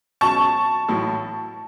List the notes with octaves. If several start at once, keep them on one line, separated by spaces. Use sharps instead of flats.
C#2 B2 F#3 C#4 A5 C#6
A1 A2 F#3